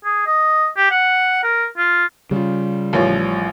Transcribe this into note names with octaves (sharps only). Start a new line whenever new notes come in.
G#4
D#5
G4
F#5
A#4
F4
C#3 G3 F4
A1 F3 C#5